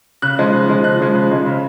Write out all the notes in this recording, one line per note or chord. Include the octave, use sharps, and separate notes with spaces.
C#3 F#6
F3 G#3 D#4
C#3
F3 G#3 D#4
C#3 F#6
F3 G#3 D#4
C#3
F3 G#3 D#4
C#3